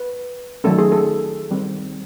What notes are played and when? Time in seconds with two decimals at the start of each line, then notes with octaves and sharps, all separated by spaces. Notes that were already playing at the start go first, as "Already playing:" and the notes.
Already playing: B4
0.64 D#3 F#3 A3 C#4 A4
0.78 G#4
0.92 A4
1.50 D#3 G3 C4